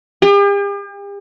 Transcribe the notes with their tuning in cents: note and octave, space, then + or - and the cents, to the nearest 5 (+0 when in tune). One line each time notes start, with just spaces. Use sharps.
G4 +45 G5 +40